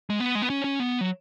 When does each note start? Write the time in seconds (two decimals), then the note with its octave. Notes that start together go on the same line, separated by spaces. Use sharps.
0.10 G#3
0.20 B3
0.35 G#3
0.42 B3
0.50 C#4
0.64 C#4
0.80 B3
1.01 F#3